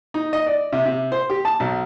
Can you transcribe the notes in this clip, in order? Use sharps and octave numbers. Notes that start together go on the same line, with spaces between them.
D#4
D#5
D5
C3
C3
C5
G4
A5
B1